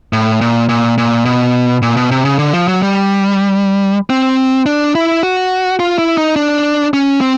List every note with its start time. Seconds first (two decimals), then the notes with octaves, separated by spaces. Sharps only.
0.13 A2
0.41 A#2
0.69 A#2
0.98 A#2
1.25 B2
1.82 A#2
1.97 B2
2.11 C3
2.25 C#3
2.39 D3
2.53 F3
2.68 F#3
2.82 G3
4.10 C4
4.66 D4
4.95 E4
5.23 F#4
5.80 F4
5.98 E4
6.18 D#4
6.36 D4
6.94 C#4
7.21 C4